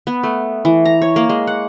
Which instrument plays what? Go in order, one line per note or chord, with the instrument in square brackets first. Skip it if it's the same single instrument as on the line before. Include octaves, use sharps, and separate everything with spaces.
[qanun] B3
A3
E3
A#5
C#5
A#3
G#3
F#5